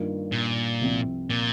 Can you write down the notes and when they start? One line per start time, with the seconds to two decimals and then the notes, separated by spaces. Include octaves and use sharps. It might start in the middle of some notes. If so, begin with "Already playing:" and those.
Already playing: G2 D#3 A#3 F4
0.32 A#2
0.81 C2 C3 F3 C4
1.30 A#2